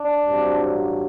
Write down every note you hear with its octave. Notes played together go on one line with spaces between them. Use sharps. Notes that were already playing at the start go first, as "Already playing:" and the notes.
Already playing: D4
A1 G2 F#3 C4